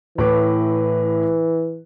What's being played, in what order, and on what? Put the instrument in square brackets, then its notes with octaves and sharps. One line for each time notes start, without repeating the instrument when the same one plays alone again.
[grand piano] A2 B4 D6 [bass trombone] E3